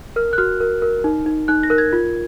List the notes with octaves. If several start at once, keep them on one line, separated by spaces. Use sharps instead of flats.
A#4 F6
F#6
F#4 F6
A#4
A#4
D#4
D#4
D#4 F#6
A#6
A#4 F#6
G#6
F4